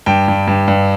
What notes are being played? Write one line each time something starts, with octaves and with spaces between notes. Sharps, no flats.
G2 G5
G2
G2
G2